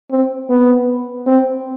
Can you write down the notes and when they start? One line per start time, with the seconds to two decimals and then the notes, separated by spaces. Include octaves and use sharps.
0.11 C4
0.50 B3
1.27 C4